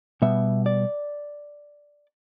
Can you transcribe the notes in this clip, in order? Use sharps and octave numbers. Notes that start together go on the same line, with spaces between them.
B2 G3 B3 E5
D5